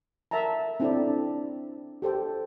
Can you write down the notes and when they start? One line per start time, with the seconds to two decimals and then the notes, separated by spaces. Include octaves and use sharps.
0.31 A#4 E5 F#5 A5 A#5
0.80 C4 D4 E4 A4 C5 D5
2.02 G4 A4 C5 G5